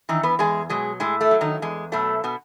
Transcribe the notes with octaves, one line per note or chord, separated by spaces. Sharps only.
D#3 E3 D#4
B3 B4
E2 G#3 G#4
B2 F#3 G#3 G#4
A2 G#3 G#4
A3 A4
F#3
D#3 D#4
E2 G#3
B2 F#3 A3
B2 B3